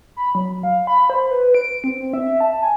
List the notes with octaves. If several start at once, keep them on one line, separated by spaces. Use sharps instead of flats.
B5
F#3
F5
B5
C5
B4
D7
C4
E5
A5
G#5